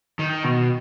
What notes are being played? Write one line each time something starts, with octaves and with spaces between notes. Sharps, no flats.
D#3
B2